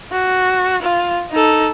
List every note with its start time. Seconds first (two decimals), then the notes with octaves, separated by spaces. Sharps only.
0.12 F#4
0.82 F4
1.31 D#4 A4